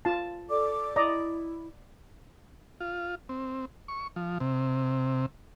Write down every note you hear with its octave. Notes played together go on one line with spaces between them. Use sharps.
F4 A5
A4 D5 D6
E4 D5 D#5 A#5
F4
C4
C#6
F3
C3